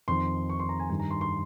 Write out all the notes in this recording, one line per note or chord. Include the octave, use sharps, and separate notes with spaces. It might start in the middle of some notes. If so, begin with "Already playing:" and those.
F2 D#3 C6
C#6
C6
A#5
G#5
G2 D#3 G#5
A#5
C6
C6